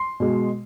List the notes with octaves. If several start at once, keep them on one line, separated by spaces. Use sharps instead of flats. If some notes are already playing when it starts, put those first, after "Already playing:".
Already playing: C6
B2 G#3